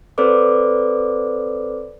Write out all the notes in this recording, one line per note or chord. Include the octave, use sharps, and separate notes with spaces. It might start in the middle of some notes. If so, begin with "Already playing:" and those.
C4 A4 B4 C5 D5 D6